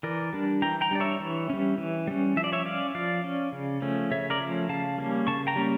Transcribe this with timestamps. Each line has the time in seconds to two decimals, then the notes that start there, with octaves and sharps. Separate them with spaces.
0.03 E3 A#4 D5
0.33 G3 D4
0.62 E3 G5 A#5
0.81 G5 A#5
0.91 G3 D4 D5
1.00 C#5 E5
1.20 E3
1.50 G3 C#4
1.78 E3
2.07 G3 C#4
2.37 F3 E5
2.44 D5
2.53 C#5 E5
2.65 C#4 D5 F5
2.95 F3 D5 F5
3.24 C#4
3.52 C#3
3.82 F3 A3 C#4
4.11 C#3 C#5 E5
4.30 A#4 D5
4.40 F3 A3 C#4
4.69 C#3 F5 A5
4.98 G3 A#3 C#4
5.27 C#3 A5 C#6
5.47 G5 A#5
5.56 G3 A#3 C#4